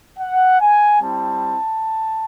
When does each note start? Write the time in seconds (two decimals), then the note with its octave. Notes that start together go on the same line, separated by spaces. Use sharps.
0.19 F#5
0.60 G#5
1.00 G3 C4 E4 A5